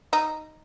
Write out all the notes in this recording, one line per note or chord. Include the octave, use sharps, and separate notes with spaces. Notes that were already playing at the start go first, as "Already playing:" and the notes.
D#4